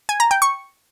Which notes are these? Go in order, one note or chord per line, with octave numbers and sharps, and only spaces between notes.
G#5
A#5
G5
C#6